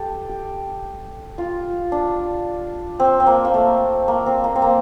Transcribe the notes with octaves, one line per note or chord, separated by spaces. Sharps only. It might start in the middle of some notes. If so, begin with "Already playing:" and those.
Already playing: G4 A4
G4
F4
D4
C4
C4
A#3
A#3
A3
A#3
C4
A#3
C4
A#3